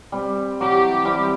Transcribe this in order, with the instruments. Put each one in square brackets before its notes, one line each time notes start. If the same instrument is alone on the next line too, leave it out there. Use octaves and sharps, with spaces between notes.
[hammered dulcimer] G3 C4
[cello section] E3 G4 [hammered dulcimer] F#3 D6
[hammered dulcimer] G3 C4 E4